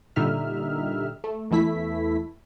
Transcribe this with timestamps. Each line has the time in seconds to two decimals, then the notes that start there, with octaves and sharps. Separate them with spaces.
0.16 A#2 D3 G3 D#4 E5 F6
1.24 A3
1.51 E2 E3 A3 E4 B6